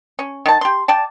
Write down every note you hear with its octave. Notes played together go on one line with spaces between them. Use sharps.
C#4
D#3 A5
G4 C6
D5 G5 A5